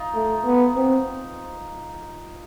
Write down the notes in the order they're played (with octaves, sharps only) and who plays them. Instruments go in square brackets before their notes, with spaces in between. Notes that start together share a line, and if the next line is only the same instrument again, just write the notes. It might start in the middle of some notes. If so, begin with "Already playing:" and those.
Already playing: [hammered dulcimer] D#4 F4
[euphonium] A3
B3
C4